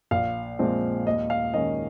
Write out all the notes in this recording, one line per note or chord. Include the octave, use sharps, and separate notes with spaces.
A#1 F5
A#2 F3 G#3 C4
D#2 D#5
F5
D#3 G#3 C#4 D#5